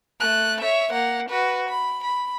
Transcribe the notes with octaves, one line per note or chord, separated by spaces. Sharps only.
A3 F#6
C#5 E5
A#3 F#5
F#4 B4
B5
B5